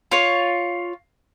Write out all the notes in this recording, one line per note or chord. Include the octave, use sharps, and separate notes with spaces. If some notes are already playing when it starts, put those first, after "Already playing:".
F4 C#5